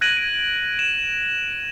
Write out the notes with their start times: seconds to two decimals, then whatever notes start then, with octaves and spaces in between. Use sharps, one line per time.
0.01 F#6 G#6 A#6 D7 D#7 F#7
0.17 D7
0.79 E7